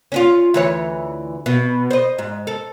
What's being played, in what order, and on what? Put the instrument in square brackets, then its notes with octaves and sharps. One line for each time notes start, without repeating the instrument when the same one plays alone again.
[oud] C#4 D4 F4
D2 E3 C#5
B2
C5 D#5
G#2
A4